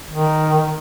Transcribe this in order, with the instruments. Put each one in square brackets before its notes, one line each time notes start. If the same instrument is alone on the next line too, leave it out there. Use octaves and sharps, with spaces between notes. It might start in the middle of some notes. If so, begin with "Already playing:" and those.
[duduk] D#3